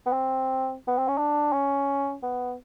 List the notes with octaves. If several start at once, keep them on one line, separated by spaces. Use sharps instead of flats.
B3
C4
B3
C4
C#4
D4
C#4
B3